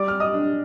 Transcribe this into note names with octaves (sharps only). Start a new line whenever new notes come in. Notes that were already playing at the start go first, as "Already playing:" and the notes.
Already playing: G3 D5 D6
F6
D#5 D#6
D4